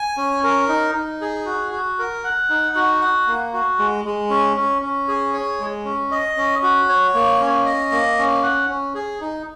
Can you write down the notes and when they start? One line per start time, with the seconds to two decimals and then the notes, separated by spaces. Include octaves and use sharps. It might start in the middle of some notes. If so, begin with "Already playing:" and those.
Already playing: G#5
0.17 C#4
0.43 A#4
0.69 D#4
0.95 D#4
1.21 G#4
1.46 F#4
1.72 F#4
1.99 A#4
2.24 F#5
2.50 D#4
2.76 F#4
3.01 F#5
3.27 A#3
3.53 F#4
3.79 G#3
4.05 G#3
4.30 C#4
4.57 C#4
4.82 C#4
5.08 G#4
5.33 C#5
5.60 G#3
5.85 C#4
6.11 D#5
6.37 C#4
6.63 F#4
6.89 C#5
7.14 A#3
7.40 C#4
7.65 D#5
7.92 A#3
8.18 C#4
8.43 F#5
8.69 C#4
8.95 G#4
9.21 D#4